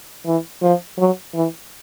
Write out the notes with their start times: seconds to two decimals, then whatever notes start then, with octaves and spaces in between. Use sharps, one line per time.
0.26 E3
0.62 F3
0.98 F#3
1.34 E3